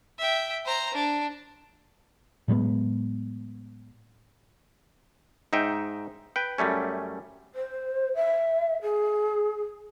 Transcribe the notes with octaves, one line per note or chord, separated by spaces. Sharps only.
E5 G5
C5 A#5
D4
A2 F#3 G#3 B3
G#2 D#4 E5 G5
B4 G5
F#2 G3 A3 C#4
C5
E5
G#4